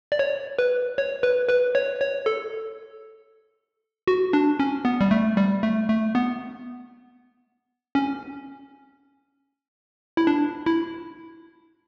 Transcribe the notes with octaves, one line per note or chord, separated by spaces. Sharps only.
D5
C#5
B4
C#5
B4
B4
C#5
C#5
A4
F#4
D4
C#4
B3
G3
A3
G3
A3
A3
B3
C#4
E4
D4
E4